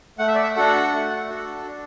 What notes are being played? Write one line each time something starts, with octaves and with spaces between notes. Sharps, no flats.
A3 F#5
E5
D5
E5
D4 F#4 A4 F#5
A3
D4 F#4 A4
D4